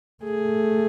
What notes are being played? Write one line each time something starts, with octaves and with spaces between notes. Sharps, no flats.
A3 G#4